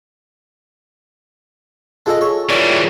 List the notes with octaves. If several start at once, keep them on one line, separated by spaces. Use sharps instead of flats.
G#3 F4 G#4 A4 D#5 A5
C#5
D#3 E3 G3 C#4 D5